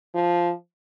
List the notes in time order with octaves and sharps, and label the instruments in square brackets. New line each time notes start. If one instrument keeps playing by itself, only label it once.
[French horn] F3